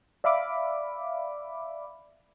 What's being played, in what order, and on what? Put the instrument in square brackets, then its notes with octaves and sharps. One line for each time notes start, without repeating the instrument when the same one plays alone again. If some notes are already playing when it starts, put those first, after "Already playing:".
[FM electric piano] D5 E5 F5 B5 D6